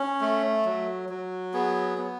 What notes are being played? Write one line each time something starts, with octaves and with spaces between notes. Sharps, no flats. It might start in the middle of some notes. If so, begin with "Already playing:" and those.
Already playing: C#4
A3
F#3
F#3
B3 G#4
B3